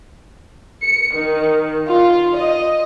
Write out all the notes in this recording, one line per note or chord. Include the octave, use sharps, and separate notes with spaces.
C#7
D#3
F4
D#5